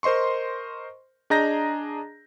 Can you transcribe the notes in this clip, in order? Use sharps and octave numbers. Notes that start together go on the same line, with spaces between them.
A#4 C5 D#5 C6 C#6
D4 G#4 D#5 A#5 G6 A#6